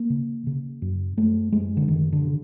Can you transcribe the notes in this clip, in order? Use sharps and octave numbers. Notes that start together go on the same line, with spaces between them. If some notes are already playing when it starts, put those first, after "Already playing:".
Already playing: A#3
C#3
C#3
F#2
F#2 A3
F#2 G#3
D3
F#2 D#3
D3
C#3